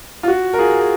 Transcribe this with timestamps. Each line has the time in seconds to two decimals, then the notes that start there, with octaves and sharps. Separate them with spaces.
0.23 F4
0.28 F#4
0.53 A#4
0.59 F4 G#4
0.80 G#4